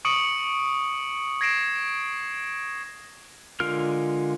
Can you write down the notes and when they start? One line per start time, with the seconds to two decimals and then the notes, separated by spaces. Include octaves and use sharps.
0.05 C#6 D#6 C#7 D7 F#7
1.41 G#6 A#6 C7 D7 E7
3.60 D3 G#3 F4 A#4 F6